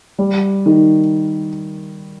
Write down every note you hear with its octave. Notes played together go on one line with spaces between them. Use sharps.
G3
D#3